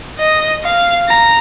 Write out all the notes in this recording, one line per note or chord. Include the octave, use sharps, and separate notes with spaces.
D#5
F5
A#5